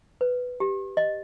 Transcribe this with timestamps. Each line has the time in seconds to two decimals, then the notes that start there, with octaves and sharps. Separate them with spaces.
0.21 B4
0.60 G4
0.97 D#5